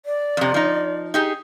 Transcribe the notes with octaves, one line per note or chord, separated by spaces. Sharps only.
D5
F2 C3
F3 D#4
D#4 G4 G#4